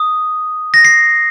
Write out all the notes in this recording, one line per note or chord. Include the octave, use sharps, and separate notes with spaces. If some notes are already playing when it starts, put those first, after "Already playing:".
Already playing: D#6
A#6
C7